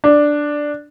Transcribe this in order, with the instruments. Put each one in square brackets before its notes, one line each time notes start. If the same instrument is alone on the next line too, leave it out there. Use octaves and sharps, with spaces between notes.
[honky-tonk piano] D4